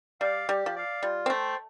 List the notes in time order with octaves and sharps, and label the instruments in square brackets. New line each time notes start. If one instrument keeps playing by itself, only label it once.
[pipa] G3 [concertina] D5 F5
[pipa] G3 [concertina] G4
[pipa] F3
[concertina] D5 F5
[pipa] G3 [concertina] F4
[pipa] C4
[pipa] A3 [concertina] C5 G5